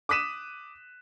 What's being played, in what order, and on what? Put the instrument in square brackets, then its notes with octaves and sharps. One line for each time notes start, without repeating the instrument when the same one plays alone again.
[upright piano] D6 D#6 F#6 B6 D#7 E7